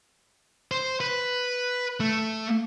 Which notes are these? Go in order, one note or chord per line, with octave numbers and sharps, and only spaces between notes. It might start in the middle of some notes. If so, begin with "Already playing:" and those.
C5
B4
A3